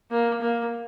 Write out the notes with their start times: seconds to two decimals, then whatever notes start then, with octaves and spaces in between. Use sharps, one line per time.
0.11 A#3
0.41 A#3